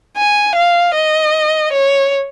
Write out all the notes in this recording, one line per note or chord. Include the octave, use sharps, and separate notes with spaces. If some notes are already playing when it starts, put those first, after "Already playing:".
G#5
F5
D#5
C#5